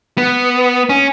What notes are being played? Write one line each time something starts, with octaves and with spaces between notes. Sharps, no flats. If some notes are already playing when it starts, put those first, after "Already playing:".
B3
C#4